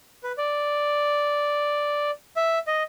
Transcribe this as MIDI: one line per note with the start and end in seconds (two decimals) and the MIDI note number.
0.23 0.32 71
0.38 2.11 74
2.36 2.59 76
2.67 2.83 75